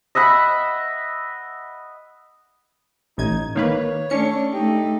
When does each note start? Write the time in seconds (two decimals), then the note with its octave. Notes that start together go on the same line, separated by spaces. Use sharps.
0.15 D#5 E5 F#5 B5
3.18 A1 D#4 G#6
3.56 D#3 A#3 B4 C#5
4.10 A3 C#4 D4 C#7
4.53 A3 D#4 G4